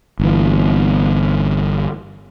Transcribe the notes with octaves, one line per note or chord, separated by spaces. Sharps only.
G1 E3